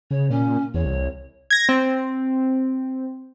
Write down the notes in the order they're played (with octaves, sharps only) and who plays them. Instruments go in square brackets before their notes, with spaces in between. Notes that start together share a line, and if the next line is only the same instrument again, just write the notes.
[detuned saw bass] C#3 [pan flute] C#5
[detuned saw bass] A#2 [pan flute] C#4
[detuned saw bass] E2 [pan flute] C#5
[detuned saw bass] C2
[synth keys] G#6 A#6
C4